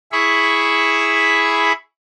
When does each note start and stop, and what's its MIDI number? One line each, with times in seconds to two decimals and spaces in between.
0.12 1.72 64
0.12 1.72 68
0.12 1.72 76
0.12 1.72 83
0.12 1.72 85